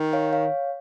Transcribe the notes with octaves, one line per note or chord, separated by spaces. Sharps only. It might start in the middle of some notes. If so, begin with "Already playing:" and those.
Already playing: D#3
C#5 F5
C#5 F5